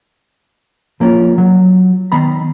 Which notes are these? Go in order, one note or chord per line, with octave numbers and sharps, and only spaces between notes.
F3 A#3 C#4 F4
F#3
D#3 B3 A#5 B5